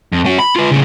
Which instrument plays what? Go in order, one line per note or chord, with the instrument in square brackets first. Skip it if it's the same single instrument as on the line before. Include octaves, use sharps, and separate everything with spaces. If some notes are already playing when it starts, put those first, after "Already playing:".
[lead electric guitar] F2
C#4 F#4
B5
F4 B4
A2 C#3